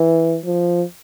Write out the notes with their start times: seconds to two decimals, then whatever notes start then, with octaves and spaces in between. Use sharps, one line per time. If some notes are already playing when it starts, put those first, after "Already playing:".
Already playing: E3
0.46 F3